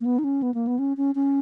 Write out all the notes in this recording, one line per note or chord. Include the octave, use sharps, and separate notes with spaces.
A#3
B3
D#4
C#4
B3
A#3
B3
C#4
C#4
C#4